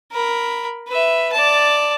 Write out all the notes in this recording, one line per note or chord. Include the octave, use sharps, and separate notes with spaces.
A#4 B5
B4 E5
D5 A5